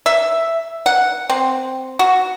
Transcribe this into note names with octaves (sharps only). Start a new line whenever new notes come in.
E5
F#5
C4
F#4